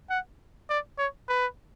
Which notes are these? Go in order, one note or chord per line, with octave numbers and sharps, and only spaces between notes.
F#5
D5
C#5
B4